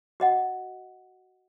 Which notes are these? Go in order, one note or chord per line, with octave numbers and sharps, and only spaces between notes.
F#4 D#5 F#5